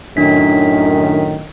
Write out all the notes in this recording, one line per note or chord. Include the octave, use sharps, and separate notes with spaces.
F#2 A2 D#3 D4 B6